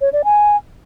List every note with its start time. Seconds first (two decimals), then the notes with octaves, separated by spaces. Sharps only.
0.01 C#5
0.13 D5
0.24 G#5